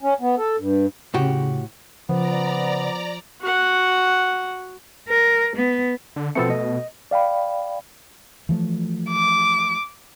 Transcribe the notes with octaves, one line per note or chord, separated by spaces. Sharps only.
C#4
B3
A4
G2
A2 C#3 F#4 G4
C#3 F3 B3 D5 A#5
F#4 F#5
A#4
B3
D3
B2 F3 A3 B3 C4 A4 C#7
B2 D#5
D5 F5 G5 B5
E3 F3 A3
D6